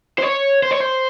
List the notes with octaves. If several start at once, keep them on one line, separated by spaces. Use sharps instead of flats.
C5
C#5
C5
C#5
C5